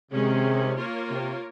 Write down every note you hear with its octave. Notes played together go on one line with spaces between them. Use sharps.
C3 D#3 G#3 C#4 G#4
A#3 F4 A#4 C#5
C3